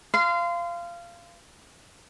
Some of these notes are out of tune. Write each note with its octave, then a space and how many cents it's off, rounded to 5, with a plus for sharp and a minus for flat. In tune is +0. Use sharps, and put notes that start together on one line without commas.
F5 -20 C6 -30